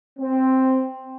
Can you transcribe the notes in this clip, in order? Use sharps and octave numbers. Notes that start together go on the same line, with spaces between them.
C4